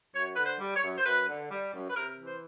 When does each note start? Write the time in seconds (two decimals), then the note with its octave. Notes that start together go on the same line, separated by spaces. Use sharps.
0.14 F#2 C#5
0.36 D3 B4
0.45 C5
0.60 G3
0.76 C#5
0.83 F#2
0.97 C5
1.05 F#2 B4
1.28 D3
1.51 G3
1.74 F#2
1.90 B4
1.96 C3 A#4
2.19 E3
2.26 C5